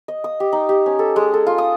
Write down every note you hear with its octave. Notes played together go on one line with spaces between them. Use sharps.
D#5
D#6
G4
D#4
G4
C#4
A4
G#3
A4
F4
D#6